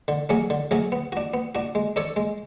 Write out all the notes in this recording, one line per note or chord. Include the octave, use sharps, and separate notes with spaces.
D3
F#3 A3 C#4 G#4
D3
F#3 A3 C#4 G#4
B3
D4 F#4
B3
D4 F#4
G#3
D4 A4 C#5
G#3